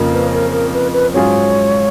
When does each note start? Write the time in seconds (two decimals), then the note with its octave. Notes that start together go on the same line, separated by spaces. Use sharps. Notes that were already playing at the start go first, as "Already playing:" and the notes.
Already playing: F2 C#3 F3 A#3 C#4
0.13 B4
0.33 A#4
0.52 A#4
0.73 B4
0.93 B4
1.13 G#2 F#3 C#4 F4 G#4 C#5